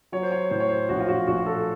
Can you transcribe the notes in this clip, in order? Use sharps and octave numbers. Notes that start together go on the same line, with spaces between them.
F#3 C#5
C5
C#5
A2 C5
C#5
C5
A#1 F#4
F4
F#4
A#1 F#4
A4